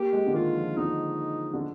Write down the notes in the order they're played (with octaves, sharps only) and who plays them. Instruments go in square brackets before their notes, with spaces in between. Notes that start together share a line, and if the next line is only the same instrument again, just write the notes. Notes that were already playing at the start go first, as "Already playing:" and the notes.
Already playing: [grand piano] A#3 [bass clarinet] G4
[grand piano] G#3
D3
[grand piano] D#3 [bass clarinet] F4
[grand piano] F3
[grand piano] D3 [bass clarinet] D#4
[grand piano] D3